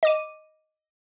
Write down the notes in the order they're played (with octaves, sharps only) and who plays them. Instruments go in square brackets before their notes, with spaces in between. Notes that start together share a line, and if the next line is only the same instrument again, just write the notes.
[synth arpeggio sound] D#5 D6 D#7